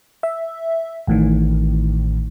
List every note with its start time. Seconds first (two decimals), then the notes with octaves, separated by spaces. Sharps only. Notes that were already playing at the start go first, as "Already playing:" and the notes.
0.23 E5
1.07 A1 A2 D#3